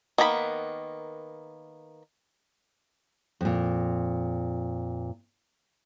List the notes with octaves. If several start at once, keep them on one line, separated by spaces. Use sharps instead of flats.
D#3 A#3 B3 A#5 B5
F2 A#2